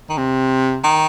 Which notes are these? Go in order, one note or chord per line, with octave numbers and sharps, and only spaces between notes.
D#3
C3
D#3